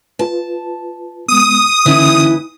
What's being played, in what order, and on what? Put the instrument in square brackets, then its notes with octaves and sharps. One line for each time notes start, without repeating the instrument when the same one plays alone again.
[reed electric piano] F4 B4 [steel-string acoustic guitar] A5
[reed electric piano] G#3 B3 [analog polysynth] D#6
[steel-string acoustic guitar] D#2 E3 E4 [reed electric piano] D3 C#4